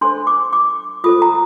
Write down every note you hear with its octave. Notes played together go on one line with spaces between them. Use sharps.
D4 A4 C5 C6
D6
D6
F4 A4 C5 D#6
A#5